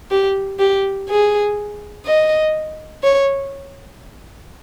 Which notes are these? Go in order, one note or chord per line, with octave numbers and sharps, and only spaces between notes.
G4
G4
G#4
D#5
C#5